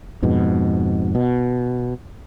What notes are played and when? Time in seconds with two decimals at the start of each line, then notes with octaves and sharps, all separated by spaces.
0.22 F2 G#2 B2
1.15 B2